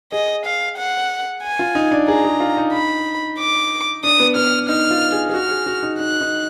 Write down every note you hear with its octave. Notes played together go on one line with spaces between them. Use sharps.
G#4 D#5
F5
F#5
G#5
F4
D#4
D4
G#4 A#5
G#4
F4
D#4
B5
D6
D4 D#6
B3
B3 F6
D#4 F6
F4
G#4
G#4
F#4 F6
G#4
F#4
D#4
D#4 F#6
D#4